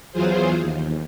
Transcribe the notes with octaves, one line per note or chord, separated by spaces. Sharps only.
E2 E3 F#3 F4 G#4 C5
D#2